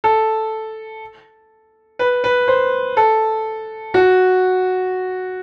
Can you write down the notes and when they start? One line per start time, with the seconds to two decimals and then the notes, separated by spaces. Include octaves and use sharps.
0.04 A4
1.99 B4
2.24 B4
2.48 C5
2.97 A4
3.94 F#4